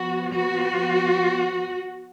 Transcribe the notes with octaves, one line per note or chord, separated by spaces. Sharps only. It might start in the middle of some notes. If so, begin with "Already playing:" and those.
Already playing: F3 B3 F#4
F#4